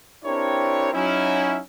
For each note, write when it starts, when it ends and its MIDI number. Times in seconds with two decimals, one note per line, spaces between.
0.25 0.90 60
0.25 0.90 62
0.25 0.90 64
0.25 0.90 67
0.25 0.90 70
0.25 0.90 73
0.94 1.59 54
0.94 1.59 61
0.94 1.59 63
0.94 1.59 64